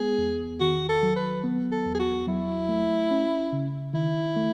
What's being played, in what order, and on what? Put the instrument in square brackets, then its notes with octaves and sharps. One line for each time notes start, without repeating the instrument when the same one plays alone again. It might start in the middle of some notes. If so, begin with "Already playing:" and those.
Already playing: [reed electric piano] G#3 B3 [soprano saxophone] G#4
[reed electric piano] E2
[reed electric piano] D#3 [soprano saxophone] F#4
[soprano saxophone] A4
[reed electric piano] F#3
[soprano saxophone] B4
[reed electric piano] B3
[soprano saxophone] A4
[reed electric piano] E2
[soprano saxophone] G#4
F#4
[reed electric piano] F#3 [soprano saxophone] E4
[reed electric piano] A3
C#4
C#3
[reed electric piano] D#3 [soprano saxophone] E4
[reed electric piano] A3